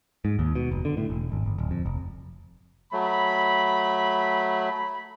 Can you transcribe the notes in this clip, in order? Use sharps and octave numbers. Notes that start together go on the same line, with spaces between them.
G#2
D#2
B2
F1
D3
A2
E1
G#1
G1
D1
F2
F1
F#3 A3 B5